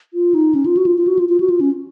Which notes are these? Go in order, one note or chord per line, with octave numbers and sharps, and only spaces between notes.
F4
D#4
C#4
F4
F#4
F4
F4
F#4
F4
F4
F#4
F4
C#4